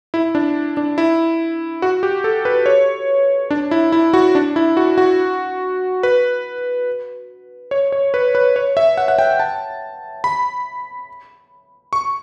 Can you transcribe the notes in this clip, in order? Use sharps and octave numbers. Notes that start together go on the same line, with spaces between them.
E4
D4
D4
E4
F#4
G4
A4
B4
C#5
D4
E4
E4
F#4
D4
E4
F#4
F#4
B4
C#5
C#5
B4
B4
C#5
E5
F#5
F#5
G5
A5
B5
C#6